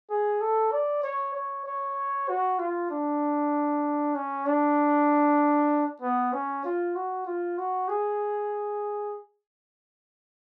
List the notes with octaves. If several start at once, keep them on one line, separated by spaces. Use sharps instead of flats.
G#4
A4
D5
C#5
C#5
C#5
F#4
F4
D4
C#4
D4
B3
C#4
F4
F#4
F4
F#4
G#4